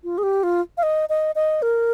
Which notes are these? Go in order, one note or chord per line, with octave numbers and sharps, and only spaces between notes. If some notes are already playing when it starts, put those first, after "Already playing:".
F4
G#4
G4
F4
F5
D#5
D#5
D#5
A#4